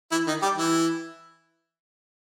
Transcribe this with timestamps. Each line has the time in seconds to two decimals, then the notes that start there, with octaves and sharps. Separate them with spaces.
0.11 E3 E4
0.27 D#3 D#4
0.42 G3 G4
0.58 E3 E4